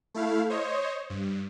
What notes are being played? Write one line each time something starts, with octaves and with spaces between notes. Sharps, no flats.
A3 E4 F5
C5 C#5 D#5
G2